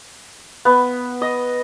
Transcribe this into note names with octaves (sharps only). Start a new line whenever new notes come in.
B3
D#5